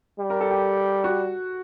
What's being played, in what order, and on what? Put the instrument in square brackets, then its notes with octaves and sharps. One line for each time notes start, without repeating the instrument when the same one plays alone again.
[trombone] G3
[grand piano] A#4
A4
G4
F#4